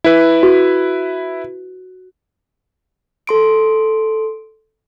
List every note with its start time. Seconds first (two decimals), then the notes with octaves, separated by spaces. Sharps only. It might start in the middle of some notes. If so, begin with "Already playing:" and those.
0.04 E4 B4
0.43 F#4
3.27 A4 C6 D7